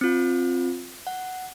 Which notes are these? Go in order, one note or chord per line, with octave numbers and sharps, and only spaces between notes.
C4 F4
F#5